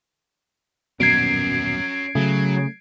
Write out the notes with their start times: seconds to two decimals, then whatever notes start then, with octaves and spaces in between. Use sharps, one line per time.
1.00 D#1 F#2 B2 C#4 A#4 G#6 C7 D7
2.15 C#3 F#3 A3